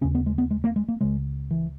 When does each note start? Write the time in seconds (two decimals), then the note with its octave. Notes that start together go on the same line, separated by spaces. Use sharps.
0.01 D#2 C#3 C#4
0.15 B3
0.26 G#3
0.38 B3
0.51 G#3
0.64 A#3
0.76 G#3
0.89 A#3
1.01 C#2 C#3 G#3
1.51 E3